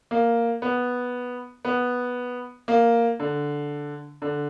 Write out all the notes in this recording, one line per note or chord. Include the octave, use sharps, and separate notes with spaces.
A#3
B3
B3
A#3
D3
D3